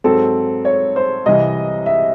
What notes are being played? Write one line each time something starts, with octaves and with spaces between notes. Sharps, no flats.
G#2 F#3 C4 A4
C#5
C5
C2 C3 E3 D#5
E5